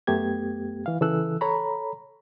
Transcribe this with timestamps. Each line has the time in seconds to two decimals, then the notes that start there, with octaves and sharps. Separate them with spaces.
0.07 F#2 A3 B3 G4 G#6
0.86 E3 F5
1.01 C#3 E3 A4 E6 F#6
1.41 A4 C#5 A#5 B5